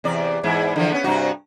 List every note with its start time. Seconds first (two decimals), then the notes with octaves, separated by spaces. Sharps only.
0.04 E2 C3 D5
0.43 E2 G#2 E4
0.76 D3 E3 F3
0.92 B3 C#4
1.04 G2 C3 F#4